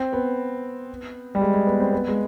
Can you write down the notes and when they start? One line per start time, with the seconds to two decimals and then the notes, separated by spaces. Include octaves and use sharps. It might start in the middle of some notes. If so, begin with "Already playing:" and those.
Already playing: C4
0.13 B3
1.35 G3
1.41 G#3
1.54 G#3
1.67 B3
1.80 C4
1.93 B3
2.08 G#3